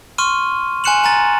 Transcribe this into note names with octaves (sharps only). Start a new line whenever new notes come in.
C6 C#6 F6 D#7
G#5 C6 F#6 C#7 E7 F#7
G#5 A#5 A6